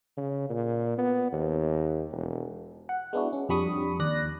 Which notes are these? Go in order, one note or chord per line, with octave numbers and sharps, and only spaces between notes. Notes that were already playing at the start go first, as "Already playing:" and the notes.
C#3
A#2
B3
D#2
E1
F#5
G#3 B3 D4 E4 F#4
C#4
F2 G3 D4 B5 C#6 D#6
D#2 D5 F#6 A#6